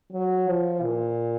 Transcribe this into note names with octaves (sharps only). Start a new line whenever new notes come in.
F#3
F3
A#2